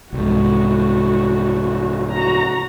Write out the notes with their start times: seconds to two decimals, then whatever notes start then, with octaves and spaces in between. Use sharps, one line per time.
0.13 C2 G#2 F#4
2.11 F#4 A#5